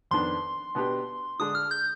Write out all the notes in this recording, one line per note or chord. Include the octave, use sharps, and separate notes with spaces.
F2 D#3 B3 D4 C6
B2 B3 D4 G4
D3 G#3 D4 D#6
F6
G6